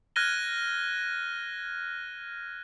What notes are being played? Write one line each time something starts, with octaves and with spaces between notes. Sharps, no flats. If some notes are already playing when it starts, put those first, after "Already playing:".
F6 F#6 G#6 A#6 D#7 G7